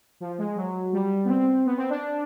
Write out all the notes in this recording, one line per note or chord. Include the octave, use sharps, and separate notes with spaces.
F3
G#3
F#3
G3
B3
C4
B3
C4
D4